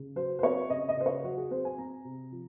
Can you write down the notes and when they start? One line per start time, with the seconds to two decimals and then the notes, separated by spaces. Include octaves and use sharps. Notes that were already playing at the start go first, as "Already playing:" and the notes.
Already playing: C#3
0.16 F#3 C5
0.39 C5
0.43 C4 C#5
0.70 C#3 D#5
0.89 D#5
0.97 C#3 C5
1.06 C#5
1.24 F#3 F#4
1.37 G#4
1.51 C4 C5
1.65 G#5
1.78 C4 A#5
2.05 C3
2.32 F3